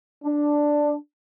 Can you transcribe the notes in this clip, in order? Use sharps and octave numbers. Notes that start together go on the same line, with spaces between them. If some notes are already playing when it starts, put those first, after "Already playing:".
D4